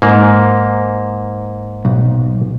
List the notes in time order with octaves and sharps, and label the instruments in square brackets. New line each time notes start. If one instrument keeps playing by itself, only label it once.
[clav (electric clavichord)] G#2 A#3
[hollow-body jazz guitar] B1